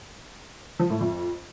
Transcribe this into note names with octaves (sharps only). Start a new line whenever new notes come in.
F3
A2
F2